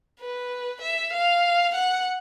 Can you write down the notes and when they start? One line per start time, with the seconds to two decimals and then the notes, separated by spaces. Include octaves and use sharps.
0.20 B4
0.82 E5
1.13 F5
1.75 F#5